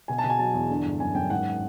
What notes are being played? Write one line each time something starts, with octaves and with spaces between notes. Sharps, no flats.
B2 G#5
A5
B2
G#5
F#3 A5
E2
D3
G1
F#2 G#5
F#2 G5
G#1 F#5